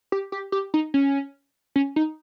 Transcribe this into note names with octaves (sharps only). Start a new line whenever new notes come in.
G4
G4
G4
D#4
C#4
C#4
D#4